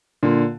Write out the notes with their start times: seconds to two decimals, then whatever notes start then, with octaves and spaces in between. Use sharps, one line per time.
0.23 A#2 D3